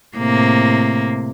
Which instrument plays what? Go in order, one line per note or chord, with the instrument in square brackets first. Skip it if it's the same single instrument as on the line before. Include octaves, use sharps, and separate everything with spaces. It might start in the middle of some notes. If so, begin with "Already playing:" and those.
[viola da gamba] A2 C3 A#3